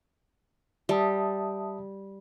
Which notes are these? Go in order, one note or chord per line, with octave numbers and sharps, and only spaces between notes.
G3 E5 A5 D#6